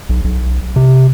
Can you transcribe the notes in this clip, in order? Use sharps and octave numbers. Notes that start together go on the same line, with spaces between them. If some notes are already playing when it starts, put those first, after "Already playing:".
B1
B1
C3